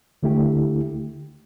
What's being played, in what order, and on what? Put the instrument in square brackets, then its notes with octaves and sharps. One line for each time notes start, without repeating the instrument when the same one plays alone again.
[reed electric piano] D2 D3 A3 E4 G4